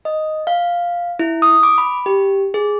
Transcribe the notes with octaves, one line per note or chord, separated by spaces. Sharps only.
D#5
F5
E4
D#6
D6
B5
G4
G#4